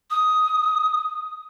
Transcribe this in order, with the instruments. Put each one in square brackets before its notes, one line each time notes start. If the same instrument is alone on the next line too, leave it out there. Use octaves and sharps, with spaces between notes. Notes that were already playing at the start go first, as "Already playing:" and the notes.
[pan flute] D#6